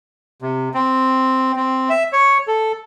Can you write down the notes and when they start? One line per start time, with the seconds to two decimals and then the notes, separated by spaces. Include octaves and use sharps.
0.42 C3
0.74 C4
1.56 C4
1.89 E5
2.13 C#5
2.47 A4